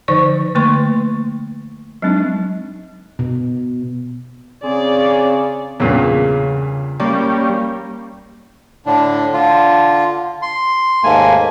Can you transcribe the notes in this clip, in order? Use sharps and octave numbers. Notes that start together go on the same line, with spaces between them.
D3 F3 D#4 C5 D5 C#6
D3 A3 A#3 B4 C6 C#6
F#3 G#3 C4 D4 D#4
B2
C#3 C4 G#4 D5
E2 G2 A#2 C#3
G3 A#3 C#4 D5
A2 D3 D4
D3 F4
C6
D#2 G#2 A3 A#3 G#5